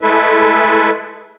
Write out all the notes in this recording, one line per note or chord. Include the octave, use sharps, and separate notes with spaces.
G#3 A3 E4 A4 B4 E5